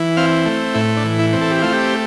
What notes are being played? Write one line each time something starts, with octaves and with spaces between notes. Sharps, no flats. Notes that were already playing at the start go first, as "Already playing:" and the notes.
Already playing: E3
C4 F5
A3
A2 E4
D4
E3
E4
C4
A4
G4
A3 F4
G4